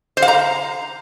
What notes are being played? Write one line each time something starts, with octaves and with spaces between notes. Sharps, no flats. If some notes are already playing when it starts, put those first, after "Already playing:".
C5
F5
A#5